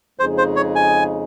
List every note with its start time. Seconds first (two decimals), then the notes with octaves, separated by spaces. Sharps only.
0.19 F2 C#3 G#3 D#4 G#4 C5
0.38 C5
0.56 C#5
0.75 G#5